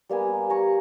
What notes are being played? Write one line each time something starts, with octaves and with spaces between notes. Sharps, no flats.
G3 A#3 B3 G#5
G#5 A#5 C#6